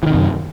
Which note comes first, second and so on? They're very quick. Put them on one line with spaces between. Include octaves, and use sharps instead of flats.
E3 D#3 C3 F#2